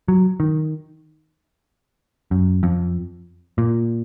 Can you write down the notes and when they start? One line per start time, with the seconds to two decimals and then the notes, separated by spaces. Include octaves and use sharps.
0.08 F#3
0.40 D#3
2.31 F#2
2.63 F2
3.58 A#2